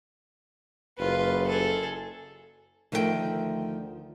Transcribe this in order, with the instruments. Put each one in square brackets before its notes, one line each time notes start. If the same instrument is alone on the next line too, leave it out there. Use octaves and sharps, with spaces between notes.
[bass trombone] F#1 [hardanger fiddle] F4 B4
[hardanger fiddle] G#4 A4
[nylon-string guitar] D2 D#3 F3 A3 G#4 G5